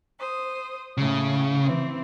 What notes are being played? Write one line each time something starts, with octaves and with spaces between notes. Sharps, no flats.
C5 D#6
A2 C#3
E3 C4